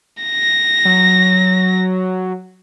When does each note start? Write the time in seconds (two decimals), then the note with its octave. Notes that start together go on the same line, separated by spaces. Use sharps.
0.24 A#6
0.85 F#3